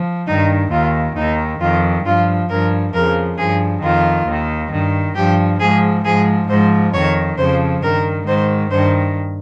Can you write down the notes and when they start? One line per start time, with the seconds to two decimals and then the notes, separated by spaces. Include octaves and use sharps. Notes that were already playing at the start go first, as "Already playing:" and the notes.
Already playing: F3
0.27 G2 D#3 D#4
0.71 D#2 D#3 F4
1.16 D#2 D#3 D#4
1.60 F2 D#3 F4
2.05 G2 F3 F4
2.49 G2 F3 A#4
2.93 F2 C#3 F3 A#4
3.37 G2 F3 G#4
3.83 F2 D#3 F4
4.27 D#2 D#3
4.72 G2 D#3
5.15 G2 F3 G4
5.60 G#2 F3 G#4
6.05 G#2 F3 G#4
6.49 G#2 F3 C5
6.93 F2 D#3 C#5
7.38 F2 C#3 F3 C5
7.82 G2 D#3 A#4
8.26 G#2 D#3 C5
8.70 G2 D#3 C5